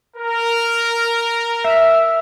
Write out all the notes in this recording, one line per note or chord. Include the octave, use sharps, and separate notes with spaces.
A#4
E5